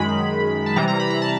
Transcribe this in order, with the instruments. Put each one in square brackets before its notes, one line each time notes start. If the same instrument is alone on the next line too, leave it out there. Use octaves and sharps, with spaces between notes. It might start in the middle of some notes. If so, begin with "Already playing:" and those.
Already playing: [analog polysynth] F#2 D#3 G#3 B5
A5
C3 E3 G3 A#5
A#5
B5
A#5
A5